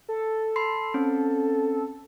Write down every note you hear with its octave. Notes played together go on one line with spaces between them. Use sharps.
A4
B5 C6 C7
C4 C#4